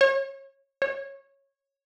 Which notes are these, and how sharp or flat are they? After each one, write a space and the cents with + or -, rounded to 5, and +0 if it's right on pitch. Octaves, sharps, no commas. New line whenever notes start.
C#5 -25
C#5 -15